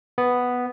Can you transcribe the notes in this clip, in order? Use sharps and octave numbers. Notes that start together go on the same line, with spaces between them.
B3